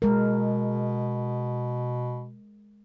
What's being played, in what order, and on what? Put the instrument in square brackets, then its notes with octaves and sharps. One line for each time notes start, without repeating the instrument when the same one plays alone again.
[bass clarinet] B2 [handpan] G#3 A#4